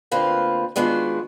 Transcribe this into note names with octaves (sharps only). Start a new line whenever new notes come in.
D2 D3 A#3 C4 F4 B4
D#3 G#3 B3 D4 F4 F#4